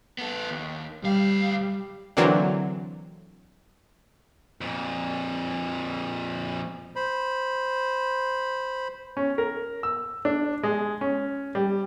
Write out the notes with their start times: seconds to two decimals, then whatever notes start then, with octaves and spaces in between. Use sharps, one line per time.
0.19 B3 A4
0.51 D#2
1.04 D2 G3 F5
2.17 D3 E3 F#3 A#3 C4 D4
4.61 F2 A#2
6.96 C5 B5
9.17 C#4
9.38 A#4
9.83 E6
10.25 D4
10.63 G#3
11.01 C#4
11.55 G3